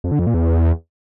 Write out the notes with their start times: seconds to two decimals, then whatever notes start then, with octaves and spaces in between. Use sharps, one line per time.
0.04 F2
0.12 D3
0.19 F2
0.27 A#2
0.34 E2